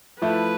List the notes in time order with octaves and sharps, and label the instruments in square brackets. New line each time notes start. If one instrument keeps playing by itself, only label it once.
[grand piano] F3 A3 E4 [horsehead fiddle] B4